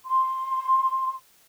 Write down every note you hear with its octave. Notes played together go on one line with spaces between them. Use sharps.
C6